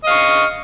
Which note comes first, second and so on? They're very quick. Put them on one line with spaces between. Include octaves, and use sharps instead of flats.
D#5 F5 C#6